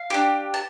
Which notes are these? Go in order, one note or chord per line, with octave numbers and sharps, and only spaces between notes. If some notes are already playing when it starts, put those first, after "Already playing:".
Already playing: F5
D4 G4
A5